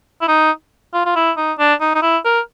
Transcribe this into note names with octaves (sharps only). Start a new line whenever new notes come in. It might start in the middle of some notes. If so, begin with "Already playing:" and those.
E4
D#4
F4
F4
E4
D#4
D4
D#4
D#4
E4
A#4